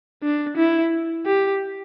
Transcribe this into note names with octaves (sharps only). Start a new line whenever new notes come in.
D4
E4
G4